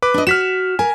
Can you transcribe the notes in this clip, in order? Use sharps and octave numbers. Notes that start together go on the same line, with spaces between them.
B4 D6
D4 D#5
F#4 F6 B6 E7
A#4 G#5